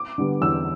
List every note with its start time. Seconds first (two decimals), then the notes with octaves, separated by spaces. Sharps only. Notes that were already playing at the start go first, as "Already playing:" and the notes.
Already playing: D6
0.18 D3 G3 B3
0.42 E2 E6